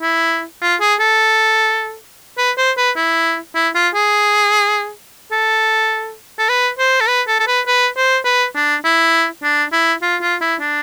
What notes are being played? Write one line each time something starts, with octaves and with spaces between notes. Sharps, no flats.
E4
F4
G#4
A4
B4
C5
B4
E4
E4
F4
G#4
A4
A4
B4
C5
A4
B4
A4
A4
B4
B4
C5
B4
D4
E4
D4
E4
F4
F4
E4
D4